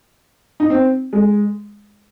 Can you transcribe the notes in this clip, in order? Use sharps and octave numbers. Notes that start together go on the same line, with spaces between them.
D#4
C4
G#3